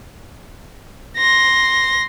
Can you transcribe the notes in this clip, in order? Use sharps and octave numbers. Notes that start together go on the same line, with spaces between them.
C6 A#6